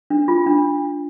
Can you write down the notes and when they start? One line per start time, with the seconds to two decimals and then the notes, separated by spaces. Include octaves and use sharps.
0.10 D4
0.28 F4
0.46 D4